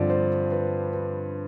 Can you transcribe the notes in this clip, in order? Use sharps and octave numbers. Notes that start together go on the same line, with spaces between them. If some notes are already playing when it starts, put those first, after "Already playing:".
Already playing: G2 D3 F3 C4 D5
C5
B4
B4